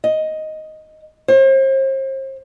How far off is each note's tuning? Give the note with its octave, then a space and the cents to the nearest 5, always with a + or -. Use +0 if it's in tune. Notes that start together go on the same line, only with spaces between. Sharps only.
D#5 +5
C5 +40